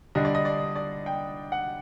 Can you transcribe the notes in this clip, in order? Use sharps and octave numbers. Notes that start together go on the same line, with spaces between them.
D3 G3 D4 D#5
D5
D#5
D5
D5
G5
F#5